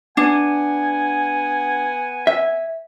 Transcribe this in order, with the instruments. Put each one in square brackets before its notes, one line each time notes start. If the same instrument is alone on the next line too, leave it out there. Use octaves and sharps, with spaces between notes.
[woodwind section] B3 F#5 G#5 [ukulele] D4
[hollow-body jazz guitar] E5